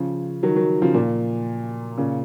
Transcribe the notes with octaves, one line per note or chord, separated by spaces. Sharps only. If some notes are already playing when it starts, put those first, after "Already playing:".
Already playing: C#3 F3
D#3 F#3
D#3 F#3
C#3 F3
A#2
A#2 C#3